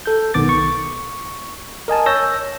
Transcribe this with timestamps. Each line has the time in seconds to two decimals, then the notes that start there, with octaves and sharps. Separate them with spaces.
0.06 A4 G6
0.34 B1 D#3 B3 D6 A6
0.49 C#6
1.88 A#4 D#5 G#5 A5
2.06 C#5 E6 G6 A#6